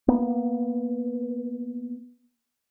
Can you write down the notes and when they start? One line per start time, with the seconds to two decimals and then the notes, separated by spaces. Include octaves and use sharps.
0.08 A#3 B3